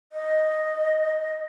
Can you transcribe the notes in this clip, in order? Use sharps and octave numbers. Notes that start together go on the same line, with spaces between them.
D#5